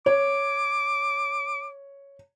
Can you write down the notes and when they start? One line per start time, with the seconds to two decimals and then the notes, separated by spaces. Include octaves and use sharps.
0.06 C#5 D6